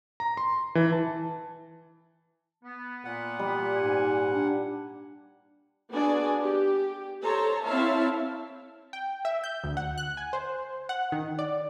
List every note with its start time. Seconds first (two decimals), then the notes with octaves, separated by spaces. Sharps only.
0.20 A#5
0.37 C6
0.75 E3
0.92 A5
2.64 B3
3.05 A#2 F#5
3.39 G3
3.76 G#2 G#5
4.32 D4
5.90 B3 D4 F#4 G#4 D5 G#5
6.40 G4
7.22 A4 C5 C#5 A5 A#5
7.66 C4 E4 C#5 E5 F5 A5
8.93 G5
9.25 E5
9.44 G6
9.64 D2
9.77 F#5
9.98 F#6
10.17 G#5
10.33 C5
10.89 F#5
11.12 D#3
11.39 D5